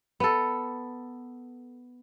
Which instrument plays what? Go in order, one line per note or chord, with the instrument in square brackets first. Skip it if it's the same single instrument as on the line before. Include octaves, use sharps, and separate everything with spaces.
[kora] B3 A4